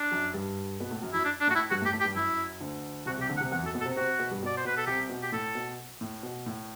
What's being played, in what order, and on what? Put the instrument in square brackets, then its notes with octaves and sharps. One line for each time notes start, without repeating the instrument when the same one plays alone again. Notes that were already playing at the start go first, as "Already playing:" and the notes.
Already playing: [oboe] D4
[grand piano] F#2 F#3
G2 G3
B2 B3
A2 A3
F#2 F#3
[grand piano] F#2 F#3 [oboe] E4
[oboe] D4
D4
[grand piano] A2 A3 [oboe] F#4
[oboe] E4
[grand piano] G2 G3 [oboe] F#4
[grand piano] A2 A3
[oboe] G4
[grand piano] A2 A3
[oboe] G4
[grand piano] G2 G3
[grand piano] F#2 F#3 [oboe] E4
[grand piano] D2 D3
[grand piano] C2 C3 [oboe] F#4
[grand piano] C2 C3 [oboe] G4
[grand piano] D2 D3
[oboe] F#5
[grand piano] C2 C3
[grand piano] E2 E3 [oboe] F#5
[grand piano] F#2 F#3 [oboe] A4
[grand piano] B2 B3
[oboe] A4
[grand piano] C3 C4
[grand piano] C3 C4 [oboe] F#4
[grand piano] B2 B3
G2 G3
[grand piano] B2 [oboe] D5
[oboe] C5
[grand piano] B2 [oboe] B4
[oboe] A4
[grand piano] C2 C3 [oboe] G4
[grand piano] B2
[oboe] G4
[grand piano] A2 [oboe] A4
[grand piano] B2
A2
B2
A2